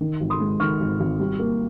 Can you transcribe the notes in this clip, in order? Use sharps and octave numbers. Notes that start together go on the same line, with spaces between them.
D#3
G#1
C6 D#6
G#2
D#3 C#6 F6
G#1
G#1
G3
A#3